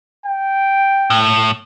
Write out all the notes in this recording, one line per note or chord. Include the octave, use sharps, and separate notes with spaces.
G5
A2